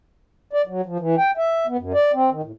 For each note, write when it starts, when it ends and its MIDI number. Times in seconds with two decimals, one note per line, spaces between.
0.53 0.62 74
0.67 0.81 54
0.86 0.98 53
1.00 1.15 52
1.18 1.31 79
1.37 1.66 76
1.67 1.77 59
1.78 1.93 42
1.94 2.12 74
2.13 2.30 60
2.31 2.41 51
2.43 2.52 45